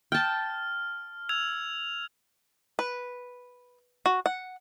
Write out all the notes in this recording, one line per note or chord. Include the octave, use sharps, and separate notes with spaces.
G5 A5 F6
E6 G#6 F7
B4
F#4
F#5